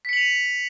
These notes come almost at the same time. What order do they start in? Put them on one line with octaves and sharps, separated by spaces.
B6 C#7 F#7 F7 D#7